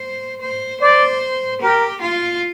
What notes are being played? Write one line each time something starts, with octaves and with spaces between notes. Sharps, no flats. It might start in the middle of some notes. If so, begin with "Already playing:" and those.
Already playing: C5
C5
C5 D5
G4 A#4
F4